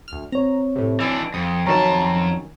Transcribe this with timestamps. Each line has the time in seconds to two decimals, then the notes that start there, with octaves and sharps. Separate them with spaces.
0.08 D2 F6
0.32 C4 C#5 A#5
0.76 A2 C3
1.00 E3 D4 D#5 G#5
1.34 F2 D#6
1.66 F2 D#3 F#3 C#4 C#5 A5 A#5